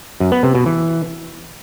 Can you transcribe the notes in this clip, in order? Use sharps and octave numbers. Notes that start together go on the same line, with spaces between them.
F#2
B3
C3
B2
E3